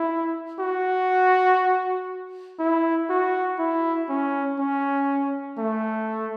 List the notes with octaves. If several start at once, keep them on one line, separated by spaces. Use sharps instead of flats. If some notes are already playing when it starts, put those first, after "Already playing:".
Already playing: E4
F#4
E4
F#4
E4
C#4
C#4
A3